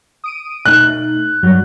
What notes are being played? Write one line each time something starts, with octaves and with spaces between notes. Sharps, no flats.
D#6 D7 D#7
B2 A3 D#4 F#6
G2 F#3 G3